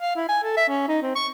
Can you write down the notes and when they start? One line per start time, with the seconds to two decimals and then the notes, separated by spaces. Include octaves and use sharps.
0.01 F5
0.16 E4
0.29 G#5
0.43 A4
0.57 E5
0.69 C#4
0.88 D#4
1.02 C4
1.15 C#6